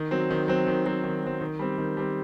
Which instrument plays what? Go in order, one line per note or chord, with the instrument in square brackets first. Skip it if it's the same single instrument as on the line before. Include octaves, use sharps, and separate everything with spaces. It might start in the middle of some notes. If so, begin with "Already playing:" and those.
Already playing: [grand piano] D#3
F#3 C4
D#3
F#3 C4
D#3
F#3 C4
D#3
F#3 C4
D#3
G3 C4
D#3
G3 C4